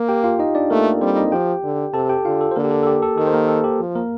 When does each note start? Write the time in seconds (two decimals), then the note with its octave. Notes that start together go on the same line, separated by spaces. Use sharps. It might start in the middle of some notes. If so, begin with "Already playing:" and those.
Already playing: A#3
0.09 G4 G5
0.24 F4 F5
0.39 D#4 D#5
0.55 D4 D5
0.70 A3 A#3 A#4
0.86 A4
1.01 G3 C4 C5
1.16 D#4 D#5
1.32 F3 G4 G5
1.64 D3
1.94 C3 A4 A5
2.09 G4 G5
2.25 D3 F4 F5
2.41 A4
2.51 C5
2.56 D3 A#3 A#4
2.64 G4
2.71 A4
2.83 A4
2.87 G4
3.02 A4
3.18 D#3 A4
3.27 C5
3.33 A#3 A#4
3.48 A4
3.64 G4
3.79 F3
3.95 A#3 A#4